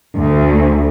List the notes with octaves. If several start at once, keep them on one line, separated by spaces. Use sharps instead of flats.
D2